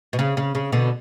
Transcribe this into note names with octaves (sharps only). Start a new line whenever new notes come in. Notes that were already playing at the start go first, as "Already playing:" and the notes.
B2
C#3
C#3
C#3
B2 D3